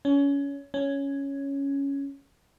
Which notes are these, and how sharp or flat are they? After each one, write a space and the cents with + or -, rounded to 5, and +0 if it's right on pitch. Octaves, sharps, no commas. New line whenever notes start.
C#4 +25
C#4 +5